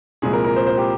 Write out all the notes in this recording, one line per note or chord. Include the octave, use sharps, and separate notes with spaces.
C2 A#2 F3 G#3 G#4
A#4
A#4
C5
C5
G4